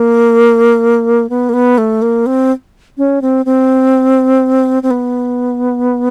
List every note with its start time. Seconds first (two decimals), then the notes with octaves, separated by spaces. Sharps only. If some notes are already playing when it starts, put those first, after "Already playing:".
Already playing: A#3
1.30 B3
1.49 A#3
1.53 B3
1.78 A3
2.02 A#3
2.26 C4
2.98 C#4
3.22 C4
3.46 C4
4.83 C4
4.91 B3